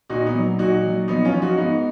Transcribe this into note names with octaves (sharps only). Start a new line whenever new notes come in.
A#2 D#4 F#4
B3 D#4
F#3
A#2 D#4 F#4
F#3
F3 B3 D#4
C#4 F4
F3
D#4 F#4
G#2 B3 D#4